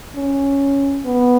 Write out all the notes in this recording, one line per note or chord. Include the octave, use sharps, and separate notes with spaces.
C#4
B3